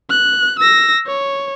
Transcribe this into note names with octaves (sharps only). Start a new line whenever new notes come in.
F#6
E6 A#6
C#5